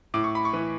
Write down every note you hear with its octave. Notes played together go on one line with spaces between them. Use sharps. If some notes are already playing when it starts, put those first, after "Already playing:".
A2 D6
C#6
B5
C#6
E3